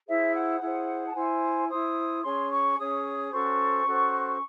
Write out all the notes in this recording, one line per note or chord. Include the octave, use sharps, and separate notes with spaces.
E4 G#4 C5 E5
F#5
E4 G#4 C5
A5
E4 C5 G#5
E4 C5 D#6
C#4 G#4 C#5 C6
C#6
C#4 G#4 C#5 D#6
C#4 F#4 A4 C5 C#6
C#4 F#4 A4 C5